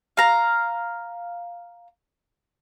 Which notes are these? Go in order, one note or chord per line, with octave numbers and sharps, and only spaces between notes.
F5 A#5